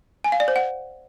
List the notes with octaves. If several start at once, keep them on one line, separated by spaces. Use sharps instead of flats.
G#5
F5
D5
C5
F#5